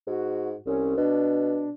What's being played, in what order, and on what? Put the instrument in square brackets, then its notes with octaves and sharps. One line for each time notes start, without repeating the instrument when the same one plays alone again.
[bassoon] G#2 [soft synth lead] F#4
[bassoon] C2 [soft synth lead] C#4
[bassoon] B2 [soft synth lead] D4